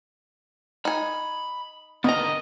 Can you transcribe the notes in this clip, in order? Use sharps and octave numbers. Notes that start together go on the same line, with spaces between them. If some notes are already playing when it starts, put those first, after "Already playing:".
D#4 G#5 B5
D3 D#3 B3 A#4 D#5 A#5